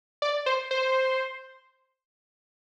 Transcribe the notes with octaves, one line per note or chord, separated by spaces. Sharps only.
D5
C5
C5